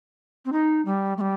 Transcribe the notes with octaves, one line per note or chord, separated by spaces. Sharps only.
C4
D#4
G3
A3
G3